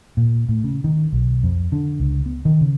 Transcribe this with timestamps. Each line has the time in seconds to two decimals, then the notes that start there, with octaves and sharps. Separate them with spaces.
0.17 A#2
0.49 A2
0.64 C#3
0.84 D#3
1.13 B1
1.43 F2
1.72 D3
2.00 C#2
2.26 B3
2.45 D#3
2.61 C#3